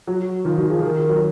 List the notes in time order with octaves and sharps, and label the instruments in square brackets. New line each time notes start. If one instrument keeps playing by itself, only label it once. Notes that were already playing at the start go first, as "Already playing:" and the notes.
[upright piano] F#3 [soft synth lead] F#4
[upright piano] D#3 [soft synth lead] F4
[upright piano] D#3 [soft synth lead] F#4
[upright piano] F3 [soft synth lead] G#4
[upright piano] D#3 [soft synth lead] A#4
[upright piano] F#3